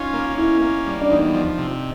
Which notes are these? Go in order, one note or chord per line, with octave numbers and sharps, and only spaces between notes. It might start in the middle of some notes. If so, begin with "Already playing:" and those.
Already playing: C#4 D#4 F4
A#3
C#4 E4
A#3
G3
D4
E2 D#4
F3
C3